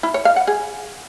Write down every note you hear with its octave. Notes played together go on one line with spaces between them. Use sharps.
E4
C#5
F5
F#5
G#4